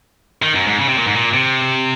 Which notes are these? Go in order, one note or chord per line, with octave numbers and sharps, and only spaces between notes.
D#3
F#2
G#2
C#3
C3
A#2
G#2
A#2
C3